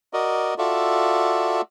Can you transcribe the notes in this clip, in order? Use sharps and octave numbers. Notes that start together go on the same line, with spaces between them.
F#4 A#4 D5 D#5
F4 F#4 A4 D5 E5